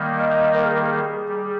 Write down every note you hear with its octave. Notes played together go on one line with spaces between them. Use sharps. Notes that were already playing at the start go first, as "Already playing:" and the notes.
Already playing: D#3 G3 A#3
D#5
A#4
G#4
G4
G#4
G3